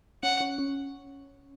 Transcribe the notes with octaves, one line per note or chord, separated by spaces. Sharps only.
C#4 F#5
C#4
C#4